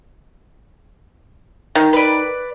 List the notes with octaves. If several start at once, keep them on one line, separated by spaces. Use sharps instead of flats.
D#3
B4 D5